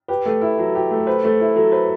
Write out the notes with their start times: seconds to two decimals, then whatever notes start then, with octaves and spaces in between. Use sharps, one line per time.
0.08 G4 B4
0.25 A3
0.41 E4
0.58 F#3
0.75 G4
0.91 A3
1.07 B4 C5
1.24 A3
1.40 E4
1.56 F#3 A4
1.72 B4 C5